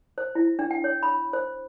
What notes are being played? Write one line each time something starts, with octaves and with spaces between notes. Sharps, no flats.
C5
E4
D4
G5
C#5
B5
C5